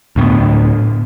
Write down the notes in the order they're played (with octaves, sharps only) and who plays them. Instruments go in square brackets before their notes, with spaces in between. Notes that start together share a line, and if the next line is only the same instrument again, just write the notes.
[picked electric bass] D2 A2 A#3 B3